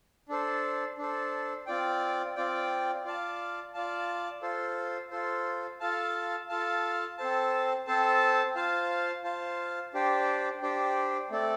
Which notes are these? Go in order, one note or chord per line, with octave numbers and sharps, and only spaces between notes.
D4 A4 C5
D4 A4 C5
C4 F4 D5 G5
C4 F4 D5 G5
F4 D5 F5 A5
F4 D5 F5 A5
F4 A4 C5
F4 A4 C5
F4 A4 F5 A5
F4 A4 F5 A5
C4 A4 C5 A5
C4 A4 C5 A5
F4 C5 F5 A5
F4 C5 F5 A5
D4 G4 C5 G5
D4 G4 C5 G5
A3 C4 A4 D5